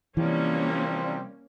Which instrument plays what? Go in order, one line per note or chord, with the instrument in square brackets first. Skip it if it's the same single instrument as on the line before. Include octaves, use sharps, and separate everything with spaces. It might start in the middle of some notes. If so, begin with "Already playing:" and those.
[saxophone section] C3 F3 G3 [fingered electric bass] E3 [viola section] A#3 C#4